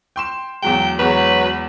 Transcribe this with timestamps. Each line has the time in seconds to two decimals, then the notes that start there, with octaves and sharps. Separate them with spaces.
0.16 G5 C6 E7
0.62 E2 F#3 G#3 G5
0.99 E2 F#3 G#3 B4